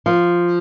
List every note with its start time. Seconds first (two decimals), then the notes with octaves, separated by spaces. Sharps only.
0.06 F3